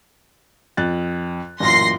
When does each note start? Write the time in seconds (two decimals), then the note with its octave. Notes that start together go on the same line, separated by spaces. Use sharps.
0.77 F2 F#6 A6
1.60 A1 F#2 A#2 C6 A#6 C7